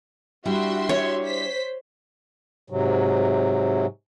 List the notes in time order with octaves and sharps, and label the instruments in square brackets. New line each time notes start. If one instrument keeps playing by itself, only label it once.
[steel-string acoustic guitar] G3 D4 E4 [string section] F#4 E5 C6
[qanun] C#5
[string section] C5 B6
[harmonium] G#2 C3 F#3